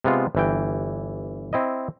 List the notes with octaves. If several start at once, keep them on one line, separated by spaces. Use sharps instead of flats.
C3 G#3 B3 F4
G1 E3 G5
C4 E4 D#5